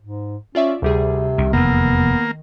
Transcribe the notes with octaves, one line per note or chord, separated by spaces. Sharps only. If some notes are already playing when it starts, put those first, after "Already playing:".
G#2
C#4 F4 D5 E5
D2 C3 G3 G#4
C2 D#3
F1 E2 A#3 B3